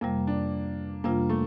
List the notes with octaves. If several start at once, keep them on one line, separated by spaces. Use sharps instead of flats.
F2 C3 G3 A#3
D4
F2 C3 G3 A#3 D4 F4
A3